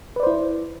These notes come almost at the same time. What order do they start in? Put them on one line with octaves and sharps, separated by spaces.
B4 D5 C5 E4